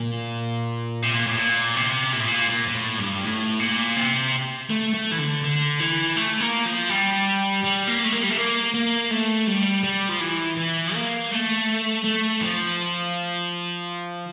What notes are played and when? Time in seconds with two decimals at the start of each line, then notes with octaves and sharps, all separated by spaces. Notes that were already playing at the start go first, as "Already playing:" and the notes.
Already playing: A#2
1.03 C3
1.14 A#2
1.26 A2
1.37 A#2
1.76 C3
2.12 A#2
2.20 A2
2.27 A#2
2.49 A#2
2.68 A#2
2.74 A2
2.98 G2
3.23 A2
3.59 A#2
3.97 C3
4.70 A3
4.94 A3
5.12 E3
5.18 D3
5.44 D3
5.80 E3
6.16 A3
6.41 A#3
6.66 F3
6.90 G3
7.63 G3
7.88 A#3
8.04 A3
8.12 A#3
8.23 G3
8.30 A3
8.37 A#3
8.74 A#3
9.10 A3
9.47 G3
9.84 G3
10.09 F3
10.20 E3
10.57 E3
10.94 A#3
11.31 A3
12.04 A3
12.41 F3